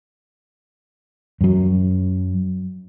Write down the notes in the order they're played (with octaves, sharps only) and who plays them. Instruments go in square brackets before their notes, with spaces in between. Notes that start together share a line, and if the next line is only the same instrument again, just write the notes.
[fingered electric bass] F#2 F#3